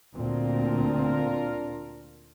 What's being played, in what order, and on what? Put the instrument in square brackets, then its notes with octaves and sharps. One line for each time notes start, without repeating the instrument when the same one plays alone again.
[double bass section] D2 A#2 C4 [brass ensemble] D4 F4 A#4